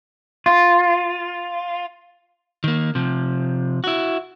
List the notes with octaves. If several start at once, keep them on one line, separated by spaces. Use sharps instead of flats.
F4
D#3 A#3
C3 F3
E4 F#4